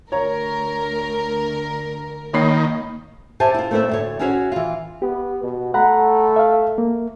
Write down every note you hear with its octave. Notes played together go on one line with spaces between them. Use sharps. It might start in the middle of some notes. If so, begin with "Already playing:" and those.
D2 A#4 C#5 A#5
D#3 A#3 C#5 B5 C7
G4 C5 C#5 E5 G#5 A5
E4 F4
A3 A#3 C4 E4 B4 E5
D2 A2 C#5
C#4 E4 F#4 G#4 A#4 C#5
E3 F4
B3 G4
B2
A3 F#5 A#5 B5
E5 F5
A#3